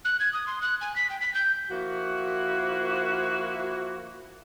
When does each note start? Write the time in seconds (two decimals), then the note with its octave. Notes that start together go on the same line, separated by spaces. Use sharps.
0.05 F#6
0.20 G#6
0.33 D#6
0.47 C6
0.62 F#6
0.81 G#5
0.96 B6
1.10 G5
1.21 B6
1.34 G6
1.70 F3 A#3 E4 F#4